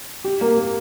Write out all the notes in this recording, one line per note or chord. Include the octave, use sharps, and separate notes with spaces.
G4
A#3
A#3